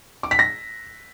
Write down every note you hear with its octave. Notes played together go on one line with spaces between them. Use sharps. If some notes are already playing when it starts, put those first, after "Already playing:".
D6
B6
A#6